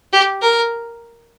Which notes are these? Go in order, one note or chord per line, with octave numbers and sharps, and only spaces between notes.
G4
A#4